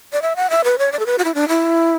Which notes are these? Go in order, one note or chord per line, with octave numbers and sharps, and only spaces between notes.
D5
E5
F#5
E5
B4
C#5
D5
A4
B4
F#4
E4
D4
E4